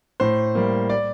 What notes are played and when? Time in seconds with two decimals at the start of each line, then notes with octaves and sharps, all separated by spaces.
0.20 A2 C5
0.55 G3 A#3
0.90 D5